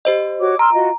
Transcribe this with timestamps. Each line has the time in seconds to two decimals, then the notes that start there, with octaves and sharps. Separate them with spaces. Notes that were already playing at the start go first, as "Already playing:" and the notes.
0.05 G4 C5 D#5
0.40 F#4 C#5 D6
0.59 A#5 C6 E6 F6
0.74 F4 F#4 D#5